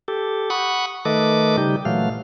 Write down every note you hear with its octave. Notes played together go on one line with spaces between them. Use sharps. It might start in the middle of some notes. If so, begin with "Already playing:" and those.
G4 A4
F#5 B5 C#6 D#6
D#3 A3 A4 B4 D#5 D6
C#3 G3 D#4 G4
A#2 E3 F#3 A3 F5